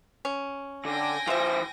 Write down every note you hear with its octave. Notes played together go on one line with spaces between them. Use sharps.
C#4
D3 G5 G#5 A#6
E3 F4 C5 E5